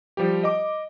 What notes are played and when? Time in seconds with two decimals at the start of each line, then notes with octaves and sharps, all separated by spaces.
0.17 F3 G3 G4
0.43 D#5 D6